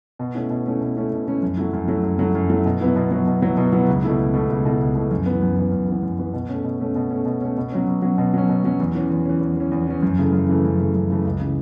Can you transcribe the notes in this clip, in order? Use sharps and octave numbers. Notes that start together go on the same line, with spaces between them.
B2
A3 C#4 E4
B2
A3 C#4 E4
B2
A3 C#4 E4
B2
A3 C#4 E4
F#2
F#3 A3 E4
F#2
F#3 A3 E4
F#2
F#3 A3 E4
F#2
F#3 A3 E4
B2
F#3 B3 E4
B2
F#3 B3 E4
B2
F#3 B3 E4
B2
F#3 B3 E4
C#2
B2 A3 E4
C#2
B2 A3 E4
C#2
B2 A3 E4
C#2
B2 A3 E4
F#2
E3 B3
F#2
E3 B3
F#2
E3 B3
F#2
E3 B3
B2
A3 C#4
B2
A3 C#4
B2
A3 C#4
B2
A3 C#4
B2
F#3 C#4
B2
F#3 C#4
B2
F#3 C#4
B2
F#3 C#4
E2
E3 C#4
E2
E3 C#4
E2
E3 C#4
E2
E3 C#4
F#2
C#3 E3 A3
F#2
C#3 E3 A3
F#2
C#3 E3 A3
F#2
C#3 E3 A3
C#2
C#3 E3